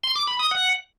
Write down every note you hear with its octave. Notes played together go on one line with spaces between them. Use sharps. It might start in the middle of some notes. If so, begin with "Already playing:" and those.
C6
D6
B5
D#6
F#5